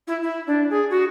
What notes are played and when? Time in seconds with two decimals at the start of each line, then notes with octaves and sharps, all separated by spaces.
0.07 E4
0.22 E4
0.47 D4
0.70 G#4
0.90 F#4